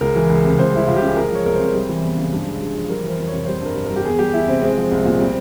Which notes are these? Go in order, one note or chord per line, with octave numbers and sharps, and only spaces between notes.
C#2 A#4
E3
C#2
C3
C#2 C5
G3 E4
C#2 F4
G4
C#3 G#4
G#3 A#4
F3 C#5
C2 A#4
C5
C3
G3
E3
E2
C#3
G2
G#3
G2
F3
G3 A#4
E3 C5
F2
C#5
C3
G3 C5
G2 A#4
G2
G3 A#4
G4
E2 G#4
G3 G4
E2 E4
C3 C4
G#3 C4
F3
C2
A#2
G3 C4